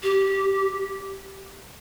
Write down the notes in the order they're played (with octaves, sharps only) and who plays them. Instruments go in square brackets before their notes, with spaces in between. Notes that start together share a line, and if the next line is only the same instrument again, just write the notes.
[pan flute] G4